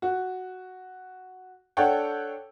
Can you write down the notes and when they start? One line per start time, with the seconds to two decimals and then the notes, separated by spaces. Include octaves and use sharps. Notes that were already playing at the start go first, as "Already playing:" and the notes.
0.02 F#4
1.77 D4 A4 C#5 F#5 G5